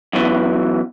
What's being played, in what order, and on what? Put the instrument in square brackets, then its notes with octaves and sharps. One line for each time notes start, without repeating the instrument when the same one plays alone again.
[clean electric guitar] F#2 B2 E3